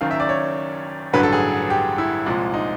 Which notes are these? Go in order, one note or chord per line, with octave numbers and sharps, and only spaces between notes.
F#1 F#2 D#3 F5
E5
D5
C#5
A1 G2 D3 F#3 B4
A4
G#4
G4
E4
C2 A#2 F3 G#3
D#4